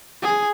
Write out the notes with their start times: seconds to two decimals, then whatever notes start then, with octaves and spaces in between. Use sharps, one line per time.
0.22 G#4